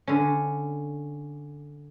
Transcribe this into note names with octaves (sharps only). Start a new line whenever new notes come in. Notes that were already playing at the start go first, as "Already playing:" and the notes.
D3 C#4